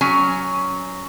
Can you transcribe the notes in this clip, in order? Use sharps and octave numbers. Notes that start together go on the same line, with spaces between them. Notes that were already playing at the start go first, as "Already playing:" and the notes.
F#3 C#4 G#5